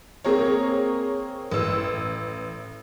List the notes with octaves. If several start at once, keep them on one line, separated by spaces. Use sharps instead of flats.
A#3 C4 G#4 A#4 C#5
A1 E6